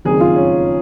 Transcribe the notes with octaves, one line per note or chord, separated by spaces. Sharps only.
F#1 F2 D#3 G#4
F4
C#4